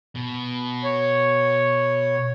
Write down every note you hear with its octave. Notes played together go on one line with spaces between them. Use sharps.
B2
C#5